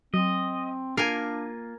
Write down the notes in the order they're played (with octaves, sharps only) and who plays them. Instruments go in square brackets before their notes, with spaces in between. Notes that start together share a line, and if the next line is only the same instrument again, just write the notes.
[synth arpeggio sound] F#3 [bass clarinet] C4 [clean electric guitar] D#5
[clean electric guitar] A#3 F4 [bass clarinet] D4 [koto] A#4 G#5 [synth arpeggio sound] C7